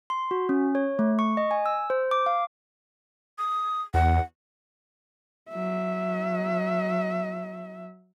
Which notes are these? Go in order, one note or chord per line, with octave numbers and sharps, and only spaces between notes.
C6
F#4
C#4
C#5
A3
C#6
D#5
G#5
E6
C5
D6
F5
D#6
E2 F#5
F#3 E5